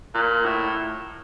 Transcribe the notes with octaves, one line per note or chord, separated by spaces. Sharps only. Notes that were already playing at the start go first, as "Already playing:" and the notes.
A#2
A2